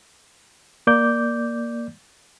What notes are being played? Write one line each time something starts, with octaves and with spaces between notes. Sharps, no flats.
A#3 D5 D6 G6